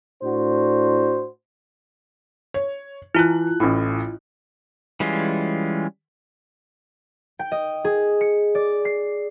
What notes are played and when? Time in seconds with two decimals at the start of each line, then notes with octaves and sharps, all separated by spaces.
0.23 A2 D4 F#4 C5
2.54 C#5
3.15 E3 E4 F4 F#6
3.60 A1 A2
5.00 E3 G3 G#3 C#4 F4
7.39 G5
7.52 D#5
7.85 G#4
8.21 C#7
8.55 D5
8.85 C7